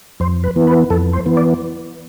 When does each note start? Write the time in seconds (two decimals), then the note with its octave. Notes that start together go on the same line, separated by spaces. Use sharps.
0.20 F2 C5
0.44 B4
0.56 E3 B3
0.67 B4
0.90 F2 A4
1.13 C5
1.26 E3 B3
1.37 D5